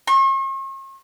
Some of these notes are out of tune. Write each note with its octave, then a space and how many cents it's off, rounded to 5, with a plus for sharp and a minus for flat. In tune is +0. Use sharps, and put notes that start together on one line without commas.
C#6 -45